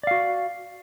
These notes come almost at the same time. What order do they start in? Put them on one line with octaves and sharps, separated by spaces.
D5 F5 F#4